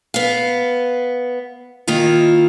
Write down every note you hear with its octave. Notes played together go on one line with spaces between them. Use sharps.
B3 F5
D#3 A#3 E4 F4